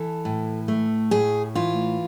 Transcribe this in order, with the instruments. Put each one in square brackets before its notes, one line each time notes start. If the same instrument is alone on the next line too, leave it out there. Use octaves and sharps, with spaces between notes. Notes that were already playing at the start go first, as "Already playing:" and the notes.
Already playing: [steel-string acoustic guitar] E3 A4
A2
A3
A2 G#4
E3 F4